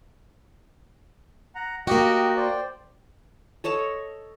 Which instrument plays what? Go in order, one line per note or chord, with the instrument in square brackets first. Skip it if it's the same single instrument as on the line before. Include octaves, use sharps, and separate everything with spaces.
[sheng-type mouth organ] F#5 A#5
[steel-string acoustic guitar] A#3 F#4 [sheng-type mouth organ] G4 D#5 G5
[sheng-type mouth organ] C5 D5 G5
[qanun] A4 C#5 D#5 A5